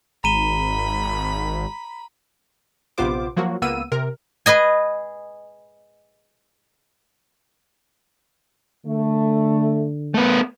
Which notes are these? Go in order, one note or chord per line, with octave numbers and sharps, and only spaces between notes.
G#1 A#5 B5 D#7 G7
A#1 C3 B3 F4 C5 D6
F3 F#3 A#3 F#4
C#2 A#3 B3 E6 D#7
C3 A#4
G#4 B4 D#5 G#5
D3 A3
A3 B3